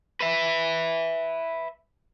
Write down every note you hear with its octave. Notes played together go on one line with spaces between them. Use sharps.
B4 E5